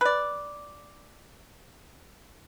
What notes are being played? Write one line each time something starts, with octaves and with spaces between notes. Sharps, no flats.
B4 D5